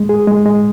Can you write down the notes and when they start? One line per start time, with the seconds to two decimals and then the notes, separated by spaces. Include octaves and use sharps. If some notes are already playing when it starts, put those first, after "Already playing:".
Already playing: G#3
0.09 G#4
0.27 G#3
0.45 G#3